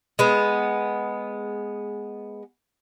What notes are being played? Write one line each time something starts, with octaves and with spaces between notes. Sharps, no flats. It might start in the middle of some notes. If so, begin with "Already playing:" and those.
G#3 B3